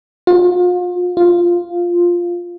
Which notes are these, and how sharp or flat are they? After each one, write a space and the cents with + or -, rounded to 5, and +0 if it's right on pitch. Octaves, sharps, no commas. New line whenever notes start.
F4 +40
F4 +0